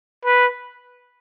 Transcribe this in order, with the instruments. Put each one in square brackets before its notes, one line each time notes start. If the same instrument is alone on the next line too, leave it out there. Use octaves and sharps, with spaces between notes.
[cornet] B4